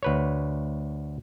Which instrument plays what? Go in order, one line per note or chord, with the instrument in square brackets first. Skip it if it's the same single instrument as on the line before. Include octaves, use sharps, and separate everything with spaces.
[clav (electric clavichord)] D2 B4 C#5